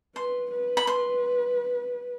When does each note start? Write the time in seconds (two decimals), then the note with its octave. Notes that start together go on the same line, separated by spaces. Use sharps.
0.16 B4 C6
0.51 B4
0.77 B5
0.87 C6